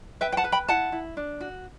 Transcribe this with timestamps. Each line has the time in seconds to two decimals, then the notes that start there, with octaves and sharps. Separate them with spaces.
0.21 B4 E5 G5
0.32 G5
0.37 F#5 A5
0.44 B4
0.52 G5 B5
0.68 E4 F#5 A5
0.92 E4
1.17 D4
1.41 F#4